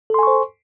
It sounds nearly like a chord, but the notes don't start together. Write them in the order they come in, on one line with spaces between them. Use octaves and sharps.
A4 C6 G#5 C#6 C5